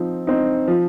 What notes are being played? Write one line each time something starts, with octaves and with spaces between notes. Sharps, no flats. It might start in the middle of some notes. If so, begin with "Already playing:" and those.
Already playing: F3 C4 D#4
C4 D#4
F3